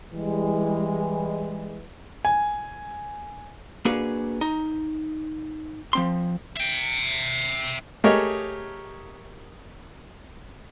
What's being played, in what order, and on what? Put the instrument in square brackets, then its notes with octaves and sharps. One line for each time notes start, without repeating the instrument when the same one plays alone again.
[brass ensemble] E3 G3 G#3
[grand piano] G#5
[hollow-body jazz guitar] A#3 D4 F#4 G#4 B4
D#4 A#5
F3 C4 C6
[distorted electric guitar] E5 G5
[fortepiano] A3 G4 G#4 A#4 C#5 D#5